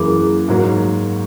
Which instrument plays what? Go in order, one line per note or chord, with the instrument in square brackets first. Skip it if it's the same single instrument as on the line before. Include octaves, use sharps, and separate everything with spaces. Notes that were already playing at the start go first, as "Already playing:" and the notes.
Already playing: [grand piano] F#2 E3 A#3 [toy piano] G#4
[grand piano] G#2 F#3 A#3